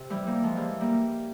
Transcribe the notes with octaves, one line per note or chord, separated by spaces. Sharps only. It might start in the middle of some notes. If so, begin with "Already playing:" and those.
Already playing: C3
E3 G3
G3 A#3
F3 G#3
E3 G3
G3 A#3